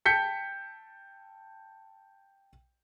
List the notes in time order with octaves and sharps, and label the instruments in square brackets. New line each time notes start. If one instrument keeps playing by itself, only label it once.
[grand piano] G5 A5 G6 B6 C#7